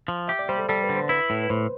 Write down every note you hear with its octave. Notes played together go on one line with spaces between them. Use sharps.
F3
G4 E5
D5
G3 C5
A4
G3 A4
B4
D3
C5
E4 B4
A2
B4
A2 C5